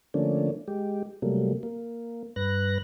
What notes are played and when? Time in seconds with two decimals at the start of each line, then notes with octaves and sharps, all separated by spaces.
0.14 D3 F3 A3 A#3 C#4 D4
0.68 G#3 G4
1.22 C3 F#3 G3 A3 A#3
1.63 A#3
2.36 G2 B4 F#6 A#6